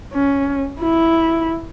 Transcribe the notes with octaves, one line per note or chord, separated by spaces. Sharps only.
C#4
E4